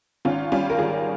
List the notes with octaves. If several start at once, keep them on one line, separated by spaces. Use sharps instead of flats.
G#1 C#4 F4
G3 C#4 F4
A#4
G#1 F4 G#4